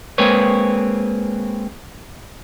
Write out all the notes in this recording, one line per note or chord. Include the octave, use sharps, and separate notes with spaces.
G#3 A#3 C4 B4 C#5